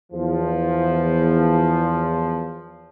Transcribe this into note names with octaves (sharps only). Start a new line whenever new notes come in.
E2 F3